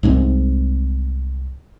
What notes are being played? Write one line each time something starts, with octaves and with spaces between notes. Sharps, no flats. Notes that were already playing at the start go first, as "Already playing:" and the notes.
C2 G#2 G#3 C4